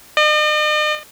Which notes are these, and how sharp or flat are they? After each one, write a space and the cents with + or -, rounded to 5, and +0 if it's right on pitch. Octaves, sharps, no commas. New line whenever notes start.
D#5 -45